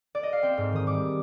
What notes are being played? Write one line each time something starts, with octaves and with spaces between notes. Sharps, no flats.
D5
D#5
F5
C4 G5
G#2
D#3 D#6
G3 D6